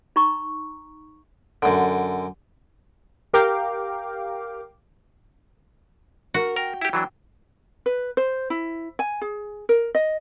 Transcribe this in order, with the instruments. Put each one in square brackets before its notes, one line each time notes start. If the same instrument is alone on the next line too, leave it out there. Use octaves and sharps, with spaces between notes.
[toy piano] D#4 A#5 C#6
[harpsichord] F#2 D3
[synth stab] G4 A#4 F5 G5 D6
[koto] F#4 [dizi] A#4
[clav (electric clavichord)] A#4 [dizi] G5
[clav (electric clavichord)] E4 G4 [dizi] G5
[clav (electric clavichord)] E3 F#3 D4
[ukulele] B4
C5
E4
G#5
G#4
A#4
D#5